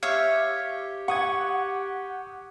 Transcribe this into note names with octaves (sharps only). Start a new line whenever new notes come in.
G4 C#5 E5 F5
F#5 C#6 D#6 G#6